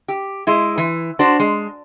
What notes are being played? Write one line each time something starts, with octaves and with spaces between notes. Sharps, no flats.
G4
G#3 E4
E3
D4 F#4 C5
G#3